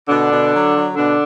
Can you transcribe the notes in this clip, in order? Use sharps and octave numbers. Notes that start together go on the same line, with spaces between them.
B2 D3 D4
B2
F#3
F#3
B2 D3 D4